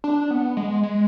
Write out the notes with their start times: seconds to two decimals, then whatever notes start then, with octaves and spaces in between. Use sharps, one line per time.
0.04 D4
0.31 B3
0.57 G#3
0.83 G#3